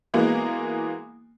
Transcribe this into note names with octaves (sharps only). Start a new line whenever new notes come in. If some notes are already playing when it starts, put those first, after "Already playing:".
E3 G#3 A#3 B3 F#4